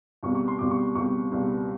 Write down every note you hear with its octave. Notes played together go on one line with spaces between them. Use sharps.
C#2 B2 G3 C4 C#6
C#6
C6
C#2 B2 G3 C4 D6
C#6
C#6
C#2 B2 G3 C4 C#6
C#2 B2 G3 C4